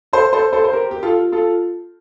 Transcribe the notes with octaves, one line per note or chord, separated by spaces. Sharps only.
A4 C5
A4 C5
A4 C5
C5
G4 A#4
G4
F4 A4
F4 A4